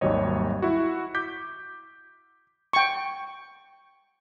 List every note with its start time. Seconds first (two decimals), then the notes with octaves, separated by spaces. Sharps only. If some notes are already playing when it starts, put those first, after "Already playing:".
0.01 G#1 D#2 F#3 G3 C#5 D#5
0.62 E4 F#4
1.15 D6 G6 B6
2.73 G5 C#6